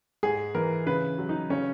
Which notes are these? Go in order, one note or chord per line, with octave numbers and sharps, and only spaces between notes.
G#2 G#4
E3 A#4
C#3 B4
F#3
D#4
C#3 C#4